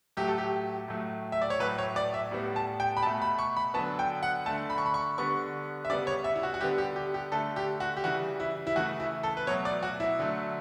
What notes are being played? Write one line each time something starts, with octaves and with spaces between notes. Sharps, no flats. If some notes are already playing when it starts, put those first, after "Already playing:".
A2 F#3 A3 G4
A4
G4
A2 F#3 A3
E5
D5
C#5
A2 F#3 A3 B4
C#5
D5
E5
A2 G3 B3
A5
G5
B5
B2 A3 A5
B5
C#6
B5
D3 F#3 B3 A5
G5
F#5
D3 A3 A5
B5
C#6
B5
C#6
D3 G3 B3 C#6
E5
C#3 G3 B3 D5
C#5
E5
E4
F#4
F#4
D3 G3 B3 G4
G4
G4
G4
D3 A3 A4
G4
F#4
G4
C#3 E3 G3 F#4
E4
E4
C#3 E3 A3 F#4
E4
A4
B4
B2 F#3 A3 C#5
D5
F#4
E4
D3 F#3 A3